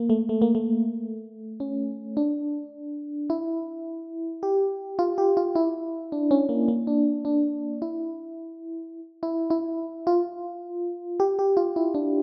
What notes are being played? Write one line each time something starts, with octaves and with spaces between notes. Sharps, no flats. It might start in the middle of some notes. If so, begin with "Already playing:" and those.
Already playing: A#3
A3
A3
A#3
A3
C#4
D4
E4
G4
F4
G4
F4
E4
D4
C#4
A#3
A#3
D4
D4
E4
E4
E4
F4
G4
G4
F4
E4
D4